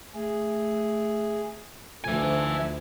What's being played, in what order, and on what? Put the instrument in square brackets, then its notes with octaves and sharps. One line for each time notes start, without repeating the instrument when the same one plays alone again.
[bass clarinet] A3 [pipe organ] G#4
[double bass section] D2 [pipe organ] F3 A3 [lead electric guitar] E5 G#5